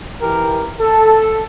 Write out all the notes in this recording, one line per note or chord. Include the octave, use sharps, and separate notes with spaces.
E3 G4 A#4
A4